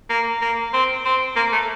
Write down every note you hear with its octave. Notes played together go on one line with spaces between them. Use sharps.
A#3
A#3
C4
C4
A#3
A3